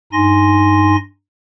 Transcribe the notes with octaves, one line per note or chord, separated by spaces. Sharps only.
G2 D#4 G#5 C6 A#6